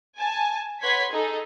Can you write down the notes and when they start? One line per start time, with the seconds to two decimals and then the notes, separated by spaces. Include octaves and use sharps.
0.19 G#5 A5
0.82 B4 C#5 F#5 C6 G#6 B6
1.11 D#4 G#4 A4